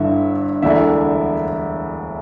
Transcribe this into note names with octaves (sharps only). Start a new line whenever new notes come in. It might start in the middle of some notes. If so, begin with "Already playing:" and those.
Already playing: G1 G2 D3 E4 E5
E1 D2 D3 E4 E5